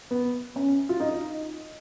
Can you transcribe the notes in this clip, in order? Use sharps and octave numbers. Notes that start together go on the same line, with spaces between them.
B3
C#4
F4
D#4